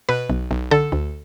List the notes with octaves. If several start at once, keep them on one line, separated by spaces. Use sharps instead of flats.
B2 B4
B1
B1
D3 A4
D2